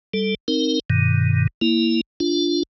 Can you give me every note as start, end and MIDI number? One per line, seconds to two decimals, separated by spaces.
0.14 0.35 55
0.14 0.35 69
0.48 0.80 60
0.48 0.80 63
0.48 0.80 70
0.90 1.47 43
0.90 1.47 47
0.90 1.47 51
1.61 2.01 58
1.61 2.01 64
2.20 2.63 62
2.20 2.63 65